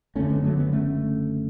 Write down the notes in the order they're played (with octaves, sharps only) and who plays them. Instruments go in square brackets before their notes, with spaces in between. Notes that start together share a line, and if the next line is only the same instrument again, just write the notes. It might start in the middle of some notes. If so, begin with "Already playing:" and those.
[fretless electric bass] F#1 E2 D3 A3 C#4
G#3 B3
F#3 A3
G#3 B3
A3 C#4